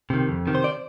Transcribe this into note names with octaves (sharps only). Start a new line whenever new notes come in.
C3 D#3
F2
C3 D#3
C5
D5